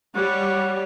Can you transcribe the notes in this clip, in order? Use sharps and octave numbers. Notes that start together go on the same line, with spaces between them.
G3 C#5 F#5